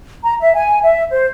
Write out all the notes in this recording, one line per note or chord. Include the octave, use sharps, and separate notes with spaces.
A#5
E5
G#5
E5
C5